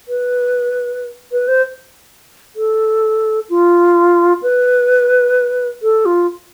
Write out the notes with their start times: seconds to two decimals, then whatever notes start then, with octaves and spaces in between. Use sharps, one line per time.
0.08 B4
1.32 B4
1.48 C5
2.56 A4
3.49 F4
4.42 B4
5.82 A4
6.05 F4